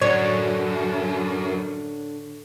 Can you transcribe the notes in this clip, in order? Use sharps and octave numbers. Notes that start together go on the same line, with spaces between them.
F#2 A2 D3 C#5 D5